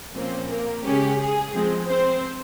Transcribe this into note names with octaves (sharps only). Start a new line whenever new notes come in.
A#2 F3 A#3 C4 C#4 C5
A#3 A#4
C#3 G#3 C#4 G4
G#4
F3 G#3 C4
C4 C5